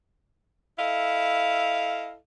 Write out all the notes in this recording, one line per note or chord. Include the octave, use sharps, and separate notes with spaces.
E4 A4 D#5 F5